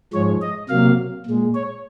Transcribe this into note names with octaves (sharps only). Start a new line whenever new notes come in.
G#2 F3 G#3 C#5
D#5
C3 F#3 A#3 F5
A#2 G#3
C#5